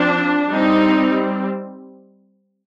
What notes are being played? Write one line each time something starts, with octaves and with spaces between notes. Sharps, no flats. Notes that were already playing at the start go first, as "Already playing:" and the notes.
Already playing: F3 C4 D4
G3 C4 D#4